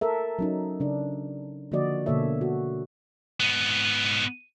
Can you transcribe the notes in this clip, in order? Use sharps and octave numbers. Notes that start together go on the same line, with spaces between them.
A4 A#4 E5
F#3 C#4 D#4
C#3 D4
D3 F3 A#3 F#4 D5 D#5
B2 D3 A#3 A4 C#5 E5
F#4
G#2 B3